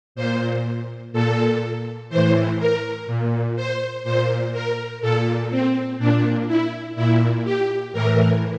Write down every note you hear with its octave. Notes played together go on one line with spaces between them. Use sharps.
A#2 C5
A#2 A4
A2 E3 C5
A#4
A#2
C5
A#2 C5
A#4
A#2 A4
C4
A#2 D4
E4
A#2 E4
G4
A2 E3 A#4